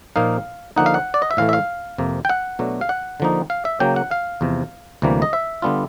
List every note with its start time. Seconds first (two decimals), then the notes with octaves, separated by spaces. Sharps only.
0.16 A#2 F3 A#3 D#4 F5
0.76 D3 F3 A#3 D#4 F#5
0.86 F5
0.94 F#5
1.14 D5
1.22 D#5
1.31 E5
1.37 A2 E3 A3 F5
1.49 E5
1.53 F5
1.98 F2 C3 F3 A#3
2.25 G5
2.29 F#5
2.59 B2 F#3 A3 D4
2.81 F5
2.89 F#5
3.20 D3 F3 A#3 D#4
3.50 F5
3.65 E5
3.80 C#3 F#3 A#3 G5
3.96 F#5
4.11 F5
4.41 E2 C3 F3
5.02 D2 C3 E3 G3 A#3
5.22 D#5
5.33 E5
5.62 D3 G3 B3 D4 F4